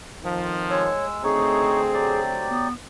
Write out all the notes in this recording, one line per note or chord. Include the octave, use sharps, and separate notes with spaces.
F2 D#3 F3
G#3 C#5 E6
D2 A3 C4 D#4 G#4 C#5
F#3 G4 D5
B3